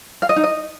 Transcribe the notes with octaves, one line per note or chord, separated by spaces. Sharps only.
F5
D#5
D#4
D#5